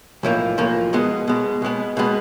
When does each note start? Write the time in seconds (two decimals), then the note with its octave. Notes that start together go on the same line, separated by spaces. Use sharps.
0.23 B1 A2 F3 A#3
0.58 B1 A2 F3 A#3
0.93 B2 G#3 B3
1.28 B2 G#3 B3
1.62 B2 G#3 B3
1.97 B2 G#3 B3